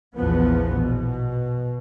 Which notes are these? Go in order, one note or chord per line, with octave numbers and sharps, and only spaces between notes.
A#1 E2 F3 B3
B2